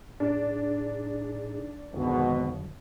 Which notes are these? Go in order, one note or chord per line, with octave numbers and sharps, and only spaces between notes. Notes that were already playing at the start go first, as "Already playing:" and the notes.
A2 D4 D#4 G#4
G#1 F2 B2 D3 F#3